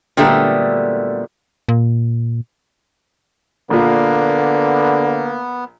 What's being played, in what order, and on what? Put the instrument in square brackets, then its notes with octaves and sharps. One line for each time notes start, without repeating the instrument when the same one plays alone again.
[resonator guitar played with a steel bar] A#2 D3 F#3 G3 A3 B3
[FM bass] A#2
[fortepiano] A#1 A#2 [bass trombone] D3 [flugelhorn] A#3 [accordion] B3